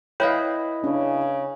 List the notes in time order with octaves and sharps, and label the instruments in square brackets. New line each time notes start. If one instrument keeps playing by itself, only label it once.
[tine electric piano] E4 B4 D#5 [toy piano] C#5 [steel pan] F5 G5
[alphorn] C#3 [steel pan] C#4 D4